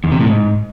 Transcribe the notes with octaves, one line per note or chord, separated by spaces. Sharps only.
E2
C3
A2
G#2